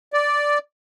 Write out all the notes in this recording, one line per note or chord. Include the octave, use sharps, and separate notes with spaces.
D5